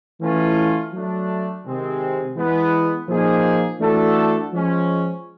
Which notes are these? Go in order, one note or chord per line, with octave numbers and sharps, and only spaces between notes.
E3 A3 C#4 F4
F#3 A3 D4
C3 D#3 G#3 C4
E3 G#3 B3
A#2 F3 A#3 D#4 G#4
E3 A3 D4 F#4 A4
F3 G#3 C#4